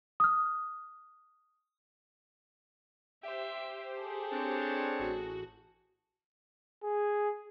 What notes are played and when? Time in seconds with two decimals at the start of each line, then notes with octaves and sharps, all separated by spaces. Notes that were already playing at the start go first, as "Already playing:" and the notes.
0.20 D#6 F6
3.23 G4 C5 E5
4.00 G#4 A4
4.32 C4 D4 C#5
4.99 A1 F#4
6.83 G#4